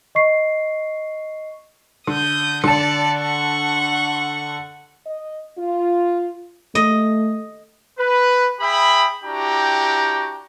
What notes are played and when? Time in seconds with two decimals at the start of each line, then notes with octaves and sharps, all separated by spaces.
0.15 D#5 C#6 C7
2.07 D3 D#6 G6
2.64 D3 D5 A5 C#7
3.19 F#5 C#6
5.07 D#5
5.58 F4
6.75 A3 D#5
7.98 B4
8.61 G#4 E5 G5 B5
9.23 D4 E4 F#4 G4 G5 A#5